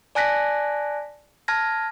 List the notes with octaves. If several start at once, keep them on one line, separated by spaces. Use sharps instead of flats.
D5 G#5 A5 F#6 A#6 B6
A5 F6 G#6 A#6